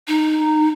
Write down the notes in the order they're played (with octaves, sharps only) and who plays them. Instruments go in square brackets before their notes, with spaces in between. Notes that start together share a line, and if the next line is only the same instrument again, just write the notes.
[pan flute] D#4